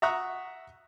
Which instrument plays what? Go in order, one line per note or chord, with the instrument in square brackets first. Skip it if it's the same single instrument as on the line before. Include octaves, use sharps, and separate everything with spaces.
[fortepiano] E5 F#5 A#5 C#6 D#6 F#6